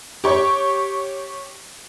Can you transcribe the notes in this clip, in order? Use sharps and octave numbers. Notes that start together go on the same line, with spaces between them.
G4 C#5 C#6